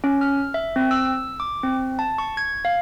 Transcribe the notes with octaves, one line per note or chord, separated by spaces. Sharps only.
C#4
F6
E5
C4
E6
D6
C4
A5
C#6
G#6
F5